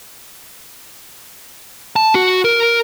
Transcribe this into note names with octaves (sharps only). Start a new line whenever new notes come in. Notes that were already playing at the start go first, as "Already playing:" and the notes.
A5
F#4
A#4